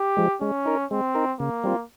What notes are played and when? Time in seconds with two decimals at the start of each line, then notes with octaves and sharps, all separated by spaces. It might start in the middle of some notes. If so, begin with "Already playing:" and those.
Already playing: G4
0.17 F3 G#3
0.41 G#3 C#4
0.66 D#4 A#4
0.91 G#3 C4
1.15 D#4 A#4
1.40 C#3 A#3
1.64 G3 C4 F4